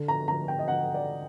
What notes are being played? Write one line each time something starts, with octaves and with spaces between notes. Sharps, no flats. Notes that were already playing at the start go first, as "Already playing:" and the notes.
Already playing: D3
A#5
D3 A#5
G5
D#5
D3 F#5
D5